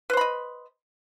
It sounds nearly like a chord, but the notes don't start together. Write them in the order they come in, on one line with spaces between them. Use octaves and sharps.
B4 C5 B5 D#5